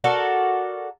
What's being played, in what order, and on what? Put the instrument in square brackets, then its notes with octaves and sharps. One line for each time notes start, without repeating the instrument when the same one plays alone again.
[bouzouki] F#4 A4 A#4 D5